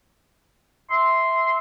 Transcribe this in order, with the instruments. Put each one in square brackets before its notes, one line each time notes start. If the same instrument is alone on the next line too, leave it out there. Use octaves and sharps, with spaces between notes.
[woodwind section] E5 C6